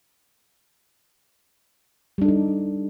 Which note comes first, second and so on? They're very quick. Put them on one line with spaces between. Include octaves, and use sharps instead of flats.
G3 D4 A4 D#4